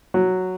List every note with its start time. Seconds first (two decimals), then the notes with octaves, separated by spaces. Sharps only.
0.14 F#3